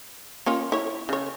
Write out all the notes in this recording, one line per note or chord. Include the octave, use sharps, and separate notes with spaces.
A#3 C#4 F4
E4 C#5
C#3 C#5